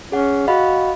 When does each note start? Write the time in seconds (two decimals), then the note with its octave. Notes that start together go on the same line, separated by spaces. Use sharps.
0.12 C#4 G#4 F#5
0.48 F#4 D#5 F5 B5